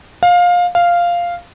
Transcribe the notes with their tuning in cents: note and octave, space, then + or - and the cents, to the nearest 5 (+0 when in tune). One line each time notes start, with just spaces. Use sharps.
F5 +20
F5 -5